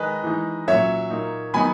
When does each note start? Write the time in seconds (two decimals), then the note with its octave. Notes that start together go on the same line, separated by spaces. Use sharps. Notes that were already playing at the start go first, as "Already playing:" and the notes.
Already playing: D#3 G#3 D#4 B4 D#5
0.24 E3 G#3 D#4
0.67 A#2 F#3 C#4 C#5 E5
1.10 A#2 A#3 D#4
1.53 D#3 F#3 B3 D#4 G#5 B5